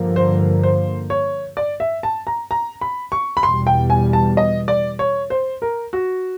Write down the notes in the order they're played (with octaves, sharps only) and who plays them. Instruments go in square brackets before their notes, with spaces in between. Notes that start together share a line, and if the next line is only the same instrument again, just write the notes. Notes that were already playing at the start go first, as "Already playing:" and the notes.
Already playing: [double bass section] G2 D3 F3 A#3
[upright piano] C5
C5
C#5
D5
E5
A5
A#5
A#5
B5
C#6
B5
[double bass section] E2 B2 G3 [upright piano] C6
[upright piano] G5
G#5
A5
D#5
D5
C#5
C5
A#4
F#4